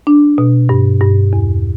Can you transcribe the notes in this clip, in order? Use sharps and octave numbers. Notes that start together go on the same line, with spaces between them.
D4
B2
G2
G2
E2